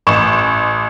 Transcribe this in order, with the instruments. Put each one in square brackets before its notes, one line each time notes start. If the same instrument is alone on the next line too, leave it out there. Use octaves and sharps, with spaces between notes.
[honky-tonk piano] A1 C#6 E7